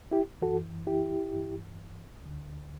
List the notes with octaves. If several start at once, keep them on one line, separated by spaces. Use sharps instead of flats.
E4 G4
F#2 E3 F#4 A4
E4 G4
G2 E3
D2 D3